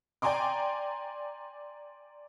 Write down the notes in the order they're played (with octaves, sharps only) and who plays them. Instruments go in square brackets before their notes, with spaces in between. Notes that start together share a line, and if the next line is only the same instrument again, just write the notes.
[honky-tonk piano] D5 G5 G#5 A#5 C6 D6